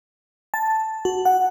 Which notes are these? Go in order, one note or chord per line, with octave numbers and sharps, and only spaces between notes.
A5
F#4
F#5